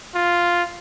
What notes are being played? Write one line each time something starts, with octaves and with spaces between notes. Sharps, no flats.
F4